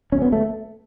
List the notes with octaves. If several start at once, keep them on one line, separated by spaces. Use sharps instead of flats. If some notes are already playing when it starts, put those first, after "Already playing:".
D2 C#4
B3
A3